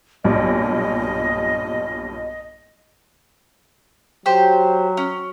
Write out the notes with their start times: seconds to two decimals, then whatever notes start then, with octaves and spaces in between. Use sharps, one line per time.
0.24 B1 G2 A#2 D#5
4.26 F#3 G4 C5
4.97 C#4